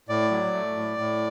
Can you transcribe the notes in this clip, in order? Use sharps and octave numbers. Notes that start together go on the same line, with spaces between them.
A2 D5
F#3
A3
A2
A2